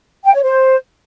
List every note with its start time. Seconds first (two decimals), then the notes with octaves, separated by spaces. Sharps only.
0.25 G5
0.34 C#5
0.43 C5